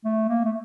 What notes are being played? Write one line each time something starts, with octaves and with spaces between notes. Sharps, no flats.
A3
A#3
A3